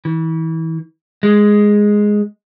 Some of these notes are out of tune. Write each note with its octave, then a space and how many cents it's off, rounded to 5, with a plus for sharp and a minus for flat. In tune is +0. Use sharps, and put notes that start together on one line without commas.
E3 -30
G#3 +0